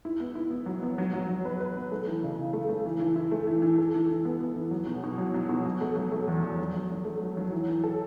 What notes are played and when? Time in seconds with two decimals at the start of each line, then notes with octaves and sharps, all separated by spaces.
0.05 E4
0.20 B3
0.35 E4
0.50 B3
0.66 F#3
0.83 B3
0.98 F#3
1.14 F#3
1.29 F#3
1.45 B4
1.60 B4
1.75 B3
1.92 A3
2.07 E3
2.23 C#3
2.38 E3
2.53 A3
2.69 A3
2.85 E3
3.00 E3
3.16 E4
3.32 A3
3.47 E3
3.62 E3
3.78 A4
3.94 E3
4.09 E3
4.25 B3
4.40 B3
4.56 E3
4.71 F#3
4.87 B2
5.03 B2
5.18 F#3
5.34 F#3
5.49 B2
5.65 F#3
5.81 A3
5.96 F#3
6.11 A3
6.27 E2
6.42 E2
6.59 F#3
6.75 F#3
6.90 F#3
7.05 A3
7.22 F#3
7.37 F#3
7.51 E3
7.68 E3
7.84 A4